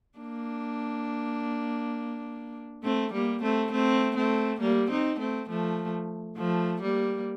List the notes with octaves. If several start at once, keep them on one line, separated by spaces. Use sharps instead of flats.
A#3 D4
A3 C4
G3 A#3
A3 C4
A3 C4
A3 C4
G3 A#3
C4 D#4
A3 C4
F3 A3
F3 A3
G3 A#3